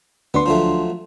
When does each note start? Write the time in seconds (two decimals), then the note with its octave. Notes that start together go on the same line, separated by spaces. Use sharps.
0.34 D2 B3 D4 C6
0.46 F3 F#3 A3